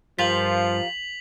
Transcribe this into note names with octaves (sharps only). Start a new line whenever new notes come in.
G2 F3 F4 G4 A#4 B6 F7 F#7